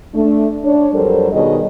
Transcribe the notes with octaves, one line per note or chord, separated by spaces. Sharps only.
A3 D4
D4 C#5
F2 F#3 G3 A4 A#4 C5
B2 D#3 G3 G#4 C#5 D#5